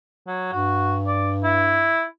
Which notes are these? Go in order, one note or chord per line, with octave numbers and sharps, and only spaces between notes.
F#3
G2 F#4
D5
E4